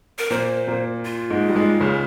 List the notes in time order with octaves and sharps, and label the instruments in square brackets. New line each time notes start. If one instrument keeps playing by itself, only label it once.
[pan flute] A#4
[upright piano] A#2 A#3 [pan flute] C5
[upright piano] A#2 A#3
[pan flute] F4
[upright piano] G#2 G#3
G3
G#2 G#3
C#2 C#3